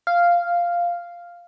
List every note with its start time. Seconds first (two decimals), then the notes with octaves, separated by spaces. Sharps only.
0.07 F5